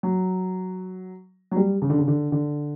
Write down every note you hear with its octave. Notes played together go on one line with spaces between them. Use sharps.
F#3
F#3
G3
C#3
D3
C#3
D3
D3